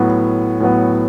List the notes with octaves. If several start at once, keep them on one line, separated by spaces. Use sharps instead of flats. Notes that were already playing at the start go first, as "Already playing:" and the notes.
Already playing: A2 F#3 B3
A2 F#3 B3